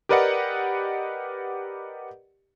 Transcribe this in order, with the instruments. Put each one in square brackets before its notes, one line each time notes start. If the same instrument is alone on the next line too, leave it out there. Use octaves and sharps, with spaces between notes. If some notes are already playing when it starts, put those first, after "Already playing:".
[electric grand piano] G4 A#4 B4 D5 D#5 F#5